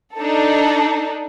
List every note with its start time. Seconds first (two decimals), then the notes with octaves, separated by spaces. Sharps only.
0.17 D4 D#4 A4